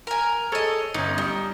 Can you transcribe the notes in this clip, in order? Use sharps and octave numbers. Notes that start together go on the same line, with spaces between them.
A#4 G#5
G#4 A4 C#5 D#5
G1 C#4 D#4
G3 D#4